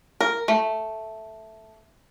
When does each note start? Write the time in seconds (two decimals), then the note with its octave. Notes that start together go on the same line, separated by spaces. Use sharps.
0.20 A#4
0.48 A3